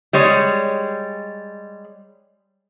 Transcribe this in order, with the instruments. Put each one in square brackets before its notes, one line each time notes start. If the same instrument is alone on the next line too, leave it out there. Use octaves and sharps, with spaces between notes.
[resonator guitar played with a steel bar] G3 G#3 C#5